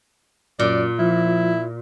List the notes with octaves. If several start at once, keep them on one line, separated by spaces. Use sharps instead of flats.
F#2 A#2 D5
F3 E4